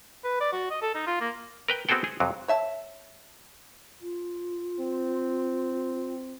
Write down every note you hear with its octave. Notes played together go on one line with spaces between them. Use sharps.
B4
D5
F#4
D#5
A4
D#4
F4
A#3
A#4 B4 G5
B3 C4 F#4 G#4 A4 G5
G#4
F2 C3 F#3
C#5 E5 A5
F4
C4